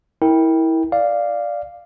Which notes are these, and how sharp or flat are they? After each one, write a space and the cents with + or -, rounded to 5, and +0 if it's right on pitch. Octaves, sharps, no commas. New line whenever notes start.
E4 -20 A#4 +0 G5 +10
D5 +0 F5 -5